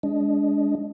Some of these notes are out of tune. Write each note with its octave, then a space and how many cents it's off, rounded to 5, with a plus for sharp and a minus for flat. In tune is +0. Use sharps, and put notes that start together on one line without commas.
G#3 +0 D4 -25 D#5 +0